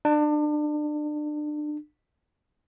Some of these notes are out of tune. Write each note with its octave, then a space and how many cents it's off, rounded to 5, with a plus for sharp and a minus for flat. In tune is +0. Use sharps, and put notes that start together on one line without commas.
D4 +30